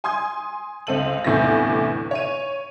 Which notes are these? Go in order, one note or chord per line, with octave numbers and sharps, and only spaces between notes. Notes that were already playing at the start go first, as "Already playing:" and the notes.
G#5 C6 D#6 G#6
C#2 C4 A4 D#7 F#7
G1 E2 A2 C3 E4 A#6
C#5 D#7